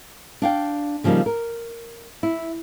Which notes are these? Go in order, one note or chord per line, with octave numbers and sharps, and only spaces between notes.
D4 F5 G5
C#3 F3 G3 A#3 D#4
A#4
E4